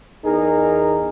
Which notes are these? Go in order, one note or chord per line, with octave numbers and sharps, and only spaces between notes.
E2 D#4 G#4 A#4